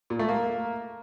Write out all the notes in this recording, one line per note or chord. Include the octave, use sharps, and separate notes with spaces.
A#2
A3
A#3